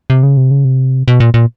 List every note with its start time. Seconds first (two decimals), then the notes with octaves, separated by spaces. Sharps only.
0.10 C3
0.23 C#3
0.37 C3
0.51 C#3
0.65 C3
1.08 B2
1.20 A#2
1.34 A#2